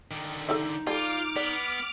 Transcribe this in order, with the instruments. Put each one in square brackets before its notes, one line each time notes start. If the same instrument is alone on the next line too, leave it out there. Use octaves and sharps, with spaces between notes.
[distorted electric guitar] D3 D#3
[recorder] D#4 [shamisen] A4 D5 E5
[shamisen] G3 A4 [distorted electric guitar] F4 [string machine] D6 F6
[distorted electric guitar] B3 [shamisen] D5